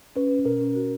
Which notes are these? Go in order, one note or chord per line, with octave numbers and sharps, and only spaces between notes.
C#4 B4
C#4
B2 A#4
C#4
F#4